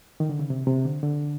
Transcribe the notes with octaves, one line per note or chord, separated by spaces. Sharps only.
D#3
D3
C#3
C3
C3
D3
D3